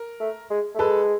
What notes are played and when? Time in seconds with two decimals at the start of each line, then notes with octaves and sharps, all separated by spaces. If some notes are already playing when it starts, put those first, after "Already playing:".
Already playing: A#4
0.20 A3
0.50 G#3
0.75 A3
0.79 G#3 A4 B4